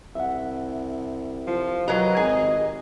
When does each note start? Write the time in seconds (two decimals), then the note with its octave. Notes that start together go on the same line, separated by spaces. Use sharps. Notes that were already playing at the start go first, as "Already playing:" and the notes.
0.15 C2 E5 F#5
1.47 F3
1.88 F#3 G4 A#4 B4 D#5 A#5
2.17 G#1 G#4